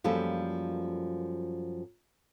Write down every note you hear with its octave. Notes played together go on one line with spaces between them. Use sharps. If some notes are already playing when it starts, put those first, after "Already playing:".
F#2 F3 G3 A#3 A4